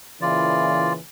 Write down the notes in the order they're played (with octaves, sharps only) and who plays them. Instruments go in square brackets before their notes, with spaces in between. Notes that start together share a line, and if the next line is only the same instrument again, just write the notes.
[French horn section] A#2 C#3 E3 [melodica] F4 D5